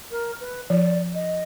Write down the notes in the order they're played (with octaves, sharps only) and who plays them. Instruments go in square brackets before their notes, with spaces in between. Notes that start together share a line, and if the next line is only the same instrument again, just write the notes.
[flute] A#4
B4
[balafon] F3 [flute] D5
[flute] D#5